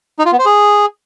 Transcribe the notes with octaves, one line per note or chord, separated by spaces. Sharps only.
D#4
F4
B3
C5
G#4